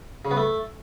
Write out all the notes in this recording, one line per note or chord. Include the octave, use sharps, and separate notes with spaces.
C#3
B3
A3